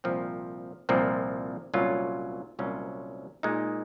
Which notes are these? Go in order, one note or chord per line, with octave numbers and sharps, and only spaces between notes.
C2 A#2 F3 C4
C2 A#2 F3 C4
C2 A#2 F#3 C#4 F4
C2 A#2 F#3 C#4 F4
A#2 G#3 D#4